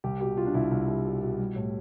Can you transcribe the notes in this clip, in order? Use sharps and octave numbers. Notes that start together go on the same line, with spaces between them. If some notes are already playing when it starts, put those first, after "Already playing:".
C2 G4
B2 G4
B2 F4
D4
C2 E4
C2
C2
B2
B2
G3
A2